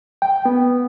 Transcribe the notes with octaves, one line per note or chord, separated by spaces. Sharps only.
G5
B3